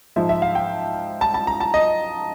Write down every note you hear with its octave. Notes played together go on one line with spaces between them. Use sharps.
G#2 F3 G#3 E5
E5
F5
G5
A5
A5
A#5
A5
D#5